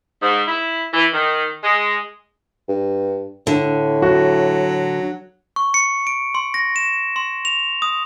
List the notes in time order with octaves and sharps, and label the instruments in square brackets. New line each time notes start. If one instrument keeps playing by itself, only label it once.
[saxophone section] G#2
E4
E3
D#3
G#3
[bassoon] G2
[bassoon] A2 [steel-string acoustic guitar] D3
[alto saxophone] F#3 [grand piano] F#4
[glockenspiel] C#6
C#7
D7
C6
A#6
E7
C6
F7
D#6